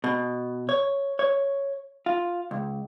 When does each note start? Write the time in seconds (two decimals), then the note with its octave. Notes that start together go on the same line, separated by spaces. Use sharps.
0.04 B2
0.69 C#5
1.19 C#5
2.06 F4
2.51 C#2